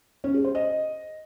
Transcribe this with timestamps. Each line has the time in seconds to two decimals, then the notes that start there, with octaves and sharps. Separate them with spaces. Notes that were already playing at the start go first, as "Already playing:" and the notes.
0.24 C#4
0.34 G#4
0.44 C5
0.55 D#5